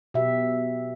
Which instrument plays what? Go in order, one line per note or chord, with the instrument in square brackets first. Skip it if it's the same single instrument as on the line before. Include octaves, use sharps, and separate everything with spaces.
[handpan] B2 G4 E5